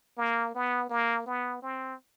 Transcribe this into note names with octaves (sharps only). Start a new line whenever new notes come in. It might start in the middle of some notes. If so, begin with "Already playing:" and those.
A#3
B3
A#3
B3
C4